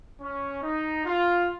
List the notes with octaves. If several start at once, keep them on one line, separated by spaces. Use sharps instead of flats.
C#4
D#4
F4